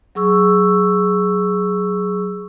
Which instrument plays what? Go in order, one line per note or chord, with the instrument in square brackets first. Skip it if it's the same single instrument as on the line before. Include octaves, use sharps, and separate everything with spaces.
[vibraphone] F#3 G#4 C#6 E6